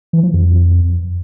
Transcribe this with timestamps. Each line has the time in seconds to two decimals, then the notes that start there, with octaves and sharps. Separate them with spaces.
0.13 E3
0.23 F3
0.34 F2